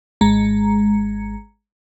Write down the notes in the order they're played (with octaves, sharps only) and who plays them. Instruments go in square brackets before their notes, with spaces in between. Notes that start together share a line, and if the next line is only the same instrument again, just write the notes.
[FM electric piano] G#1 G#3 A#5 C#7